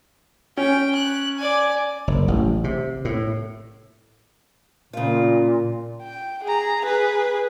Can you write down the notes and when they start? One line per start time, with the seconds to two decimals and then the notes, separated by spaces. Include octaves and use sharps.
0.57 C#4 G5
0.95 F#6
1.38 D5 G#5
2.07 F#1
2.28 A1
2.64 C3
3.05 A2
4.93 A#2 C#3 F4
6.02 G5
6.44 G#4 A#5
6.85 G#4 B4